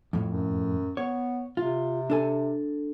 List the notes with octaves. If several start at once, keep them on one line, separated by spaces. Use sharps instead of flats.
F2 A2
F#2
B3 C#5
C3 F4
D4 A4 G#5